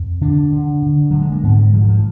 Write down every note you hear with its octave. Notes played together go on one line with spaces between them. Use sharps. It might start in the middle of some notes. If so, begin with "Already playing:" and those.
Already playing: F2
D3 D4
D3
D3
D3 F#3
G#3
A#3
G#2 B3
G#3
G#2 F3
D#3
F3